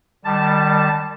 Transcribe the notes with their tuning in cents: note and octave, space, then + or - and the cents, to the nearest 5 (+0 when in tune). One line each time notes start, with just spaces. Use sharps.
D#3 -35 G3 +0 A5 +0